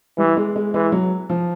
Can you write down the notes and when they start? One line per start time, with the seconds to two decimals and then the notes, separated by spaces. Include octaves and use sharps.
0.18 E3 G3
0.37 G#3
0.56 G#3
0.73 E3 G#3
0.92 F#3
1.30 F3